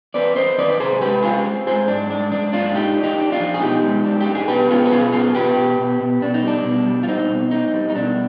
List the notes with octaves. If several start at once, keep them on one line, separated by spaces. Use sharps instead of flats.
C4 B4 D5
C4 C5 D#5
D#3 B4 D5
D5
C3 G#4 C5
G#3 G4 B4
C4 F4 G#4
C4
G#3 G#4 C5
G#2 D4
G#3 D4
G#3 D4
G#2 D4 F4
D4 D#4 G4
D4
D#4 G4
D4
D4 F4
F3
G#4
B2 D#4 G4
G#3
D4
G4
D4
G#4
B2 G4 B4
B3 F4 G#4
B4
B2 F4 G#4
B3 F4 G#4
B2 G4 B4
B2
B2
B2
B2 D4
D#4
G3 D4
B2
G3
F4
C4 D#4
B2
C4 D#4
G3
D#4
B2 D4